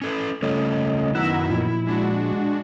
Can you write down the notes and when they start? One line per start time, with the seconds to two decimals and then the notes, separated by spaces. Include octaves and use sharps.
0.02 C#4 A4 B4
0.42 C#3 G3 A3 C#4 F4 D#5
1.15 F#2 B2 D#3 E4 F#5 A#5 E6
1.50 A#2 F3
1.87 G#3 D4 F#4